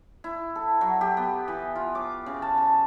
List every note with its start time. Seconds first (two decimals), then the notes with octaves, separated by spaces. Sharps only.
0.24 E4
0.56 A4
0.81 F#3
1.01 G4
1.17 B3
1.48 E3
1.76 F4
1.95 D6
2.26 C#3
2.42 A5
2.57 A5